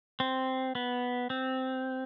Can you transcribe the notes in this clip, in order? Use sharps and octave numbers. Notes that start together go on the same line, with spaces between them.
C4
B3
C4